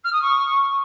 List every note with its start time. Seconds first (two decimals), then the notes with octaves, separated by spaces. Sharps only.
0.04 F6
0.12 D#6
0.22 C#6